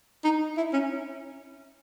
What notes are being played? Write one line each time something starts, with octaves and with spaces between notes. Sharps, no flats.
D#4
E4
C#4